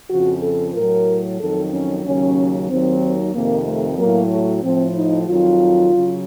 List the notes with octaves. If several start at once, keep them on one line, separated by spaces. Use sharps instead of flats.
F2 C#3 F3 F#4
A4
A2 F#3 A#4
F2 D#3 F#3 A4
C#4
D#2 C#3 F#3 C#4
D#2 D#3 F#3 C4
F2 C3 D#3 A#3
A3
A2 F#3 A#3
A3
A2 F3 C4
D#4
F2 D#3 F#3 F4
C#3 F#3